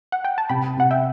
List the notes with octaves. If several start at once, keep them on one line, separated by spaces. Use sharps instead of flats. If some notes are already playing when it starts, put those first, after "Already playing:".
F#5
G5
A5
C3 G5 B5
C3 F#5
E5 G5